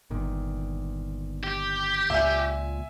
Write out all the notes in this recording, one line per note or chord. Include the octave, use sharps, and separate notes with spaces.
G1 A#2 D#3
G4
C#2 A#2 E5 G#5